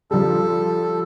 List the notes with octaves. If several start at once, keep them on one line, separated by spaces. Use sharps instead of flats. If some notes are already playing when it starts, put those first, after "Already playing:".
F3 G3 A4